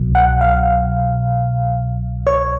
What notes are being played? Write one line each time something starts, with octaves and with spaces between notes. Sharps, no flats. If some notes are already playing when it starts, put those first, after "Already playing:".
Already playing: C2 B2 F#3
F#5
F5
C#5